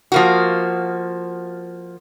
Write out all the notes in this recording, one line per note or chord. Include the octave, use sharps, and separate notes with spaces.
F3 A#3 F#4